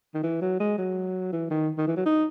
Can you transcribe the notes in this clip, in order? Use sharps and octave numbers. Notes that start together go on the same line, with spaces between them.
D#3
E3
F#3
G#3
F#3
E3
D#3
D#3
E3
F#3
D#4